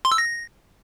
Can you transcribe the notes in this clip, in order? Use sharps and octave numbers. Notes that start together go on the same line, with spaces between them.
C6
E6
A#6